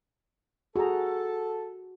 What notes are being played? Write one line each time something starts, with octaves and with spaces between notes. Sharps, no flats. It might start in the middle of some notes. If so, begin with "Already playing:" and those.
F#4 G#4 A4 A#5